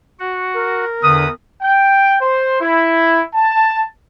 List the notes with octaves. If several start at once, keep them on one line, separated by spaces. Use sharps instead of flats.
F#4 F#5
A#4
E2 D3 B4 D#6
G5
C5
E4
A5